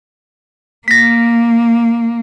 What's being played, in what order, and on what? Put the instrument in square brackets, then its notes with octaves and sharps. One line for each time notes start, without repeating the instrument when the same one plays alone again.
[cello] A#3 [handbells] A#6 B6